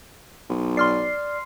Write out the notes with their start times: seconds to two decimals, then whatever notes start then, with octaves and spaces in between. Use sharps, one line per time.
0.49 B1
0.77 D5 C6 F6 C7